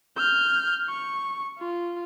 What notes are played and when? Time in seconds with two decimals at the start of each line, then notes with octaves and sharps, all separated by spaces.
0.17 F6 G6
0.89 C#6
1.59 F4